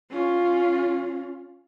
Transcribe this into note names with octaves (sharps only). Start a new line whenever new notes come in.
C#4 F4